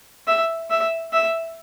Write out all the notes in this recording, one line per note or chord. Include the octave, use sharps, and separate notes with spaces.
E5
E5
E5